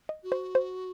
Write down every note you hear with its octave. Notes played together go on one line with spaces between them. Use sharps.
D#5
F#4
C5
C5